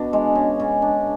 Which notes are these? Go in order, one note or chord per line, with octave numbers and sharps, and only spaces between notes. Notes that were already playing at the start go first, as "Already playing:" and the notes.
Already playing: B2 D4
G#3
C#3
C#3
D4